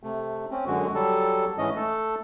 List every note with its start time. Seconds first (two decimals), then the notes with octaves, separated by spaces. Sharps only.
0.03 C3 A3
0.51 C4 C#4
0.67 F#2 D3 G#3 F#4
0.95 F#3 G3 A4
1.58 G#2 E3 C#4 D#5
1.76 A3 A4